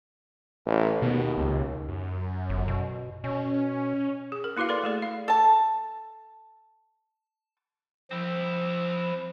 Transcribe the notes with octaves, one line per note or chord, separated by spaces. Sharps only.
A1
D#2 B2
C#2
F#2
G1
B2
B2 C#4
G#4
A#4
A#3 E4 F#4 B4 F5
A4 B4 D5 C6
A3 G#4 D5
F5
A4 A5
F3 C4 E4